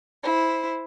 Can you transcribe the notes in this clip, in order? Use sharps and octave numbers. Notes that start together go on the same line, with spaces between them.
E4 C5